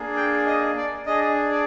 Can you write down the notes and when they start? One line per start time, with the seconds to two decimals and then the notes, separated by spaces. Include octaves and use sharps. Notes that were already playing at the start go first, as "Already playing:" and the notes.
Already playing: A#3 D4 G#4
0.16 G5
0.46 D#5
0.77 D5
1.06 D4 G#4 D#5
1.51 D5